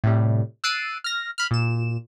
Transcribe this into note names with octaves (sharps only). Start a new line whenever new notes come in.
A2 C3 G3
E6 F#6 A6 C7 D7 D#7
F6 A#6
B5 F6
A#2 E7